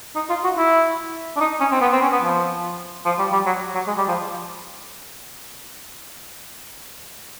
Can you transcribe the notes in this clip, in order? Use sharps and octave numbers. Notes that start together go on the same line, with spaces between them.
D#4
F4
F#4
E4
D4
D#4
C#4
C4
B3
C4
C#4
B3
F3
F3
G3
G3
F#3
F#3
G#3
G3
F3